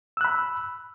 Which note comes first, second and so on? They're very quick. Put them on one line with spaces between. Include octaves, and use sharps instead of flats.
E6 F#6 B5